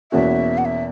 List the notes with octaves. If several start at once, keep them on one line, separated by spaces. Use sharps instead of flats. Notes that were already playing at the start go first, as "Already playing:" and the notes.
E2 B2 A#3 C#4 F#4 E5
F#5
E5